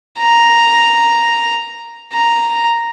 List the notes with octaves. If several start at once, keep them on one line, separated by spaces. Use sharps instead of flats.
A#5
A#5